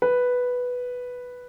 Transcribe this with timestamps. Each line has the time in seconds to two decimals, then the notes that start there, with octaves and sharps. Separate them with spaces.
0.02 B4